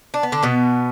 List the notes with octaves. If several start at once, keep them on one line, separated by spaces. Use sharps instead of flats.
D4
B3
D3 D4
B2 B3